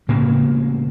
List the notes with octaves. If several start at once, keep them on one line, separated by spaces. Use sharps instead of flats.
A2 C#3 A#3 C4